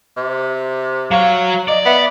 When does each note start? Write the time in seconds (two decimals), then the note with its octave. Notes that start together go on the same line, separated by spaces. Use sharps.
0.17 C3
1.11 F#3 C#5 F5
1.68 D5 D#5
1.85 B3 E5